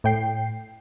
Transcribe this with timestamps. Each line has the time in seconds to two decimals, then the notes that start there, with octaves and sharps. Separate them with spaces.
0.04 A2 G5 C7